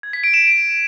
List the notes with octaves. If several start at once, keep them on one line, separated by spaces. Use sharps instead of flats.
G#6
B6
D7
E7